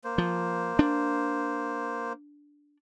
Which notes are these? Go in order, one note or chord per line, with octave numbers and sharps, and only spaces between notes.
A#3 C5
F3
D4